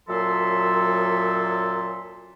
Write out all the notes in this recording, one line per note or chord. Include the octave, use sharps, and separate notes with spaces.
F#2 A#2 F#3 A4 E5 C6